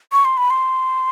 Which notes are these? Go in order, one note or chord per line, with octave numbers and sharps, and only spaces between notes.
C#6
C6
B5
C6